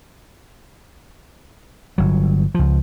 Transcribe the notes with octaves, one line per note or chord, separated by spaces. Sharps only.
G1 F#3
C#2 F3